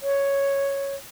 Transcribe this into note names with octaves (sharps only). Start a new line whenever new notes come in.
C#5